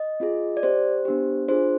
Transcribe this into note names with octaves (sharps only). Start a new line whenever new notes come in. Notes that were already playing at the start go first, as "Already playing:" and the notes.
Already playing: D#5
C4 F4 G#4
D5
C4 G4 C5
B3 D4 G4
D4 F4 G#4 C5